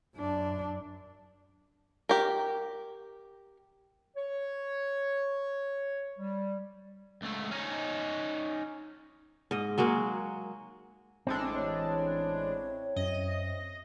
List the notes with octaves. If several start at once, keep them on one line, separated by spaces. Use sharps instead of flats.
F#2 D4
G4 A#4
C#5
G3
C#2 A3
C#4 D#4
G#2 D#5
F#3 G#3 A#3 F#4
A1 G#3 C4 D4 E4 A4
C#5
F#2 D#5